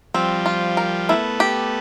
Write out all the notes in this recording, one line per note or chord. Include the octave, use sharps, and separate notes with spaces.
F3 G3 C4
F4
A#4
A3 B3 E4
G4